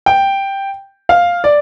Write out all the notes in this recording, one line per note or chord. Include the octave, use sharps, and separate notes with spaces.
G5
F5
D5